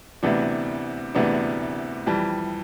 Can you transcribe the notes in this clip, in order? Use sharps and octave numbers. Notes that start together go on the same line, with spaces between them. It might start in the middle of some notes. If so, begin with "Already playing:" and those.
D2 C3 E3 B3 D4
D2 C3 E3 B3 D4
F2 E3 G3